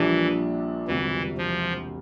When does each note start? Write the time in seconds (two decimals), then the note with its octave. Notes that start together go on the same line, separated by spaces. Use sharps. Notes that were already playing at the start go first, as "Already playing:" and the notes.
Already playing: A#1 A#2 E3 G3 D4
0.87 E1 D2 C3 E3 G3 C4
1.38 F3